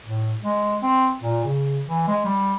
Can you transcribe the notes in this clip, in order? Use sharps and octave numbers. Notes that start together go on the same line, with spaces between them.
A2
G#3
C4
A#2
C#3
E3
G#3
G3